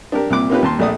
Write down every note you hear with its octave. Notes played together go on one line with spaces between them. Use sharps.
D4 G4 A#4
C2 A#2 D6
A#3 C#4 D#4 F4 G4 B4
D#2 A5 C6
A#1 A3 D5 D#6